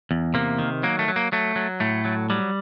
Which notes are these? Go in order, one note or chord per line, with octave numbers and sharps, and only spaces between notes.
E2
C3 A#3
D#3
F#3 A#3
A3
F#3
A#3
F#3 A3
F#3
A2 A3
F#3
F#3 G3